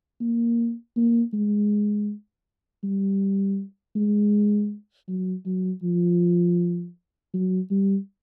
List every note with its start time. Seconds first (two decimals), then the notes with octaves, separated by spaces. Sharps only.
0.21 A#3
0.96 A#3
1.33 G#3
2.83 G3
3.95 G#3
5.08 F#3
5.45 F#3
5.83 F3
7.34 F#3
7.71 G3